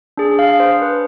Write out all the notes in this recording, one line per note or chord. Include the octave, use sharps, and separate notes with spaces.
D4 G#4
F5
C5
B4